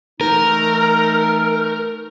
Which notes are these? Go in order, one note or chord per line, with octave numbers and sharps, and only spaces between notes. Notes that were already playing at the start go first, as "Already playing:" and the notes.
E3 A3 D#4 A#4